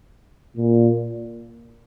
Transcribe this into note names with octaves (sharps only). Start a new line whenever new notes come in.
A#2